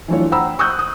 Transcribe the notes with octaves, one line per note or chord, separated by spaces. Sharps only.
E3 F#3 A3 D4 F4 C#5
C5 F#5 G5 A#5 B5 E6
C#6 D#6 E6 F#6 G6
D#6